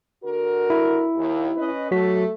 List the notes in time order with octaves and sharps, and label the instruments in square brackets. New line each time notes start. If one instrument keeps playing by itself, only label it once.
[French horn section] D3 F#4 A#4
[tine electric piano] E4
[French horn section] D#2
C#4 B4 D#5
[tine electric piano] F#3 F#4 B6 [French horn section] A3